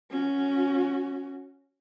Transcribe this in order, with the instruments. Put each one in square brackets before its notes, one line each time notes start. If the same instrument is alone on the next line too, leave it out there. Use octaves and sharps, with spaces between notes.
[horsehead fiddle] C#4 F#4